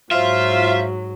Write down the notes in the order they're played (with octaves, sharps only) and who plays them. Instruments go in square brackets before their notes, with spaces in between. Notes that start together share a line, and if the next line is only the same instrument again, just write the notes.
[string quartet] G#2 F#3 [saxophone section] F4 C5 [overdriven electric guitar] E5